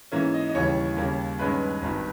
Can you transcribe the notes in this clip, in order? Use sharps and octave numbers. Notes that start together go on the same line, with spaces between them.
G#2 E3 A#3 C#4 E5
D#5
D#5
D#2 C#3 E3 G3 C#5
D#2 C#3 G3 A#3
G2 D#3 G#3 C#4 B4
G#1 G2 D#3